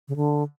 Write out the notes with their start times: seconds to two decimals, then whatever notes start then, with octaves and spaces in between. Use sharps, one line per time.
0.08 C#3
0.16 D3